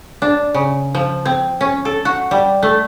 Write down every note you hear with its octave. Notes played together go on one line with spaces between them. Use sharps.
D4
C#3
F3
C4
C#4
A4
F#4
G3
A3